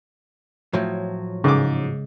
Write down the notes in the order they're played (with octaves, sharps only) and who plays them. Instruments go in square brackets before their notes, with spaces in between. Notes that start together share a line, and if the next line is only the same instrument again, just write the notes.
[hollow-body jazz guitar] A2 F3 F#3
[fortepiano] G#2 D6 [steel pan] C#3 G#3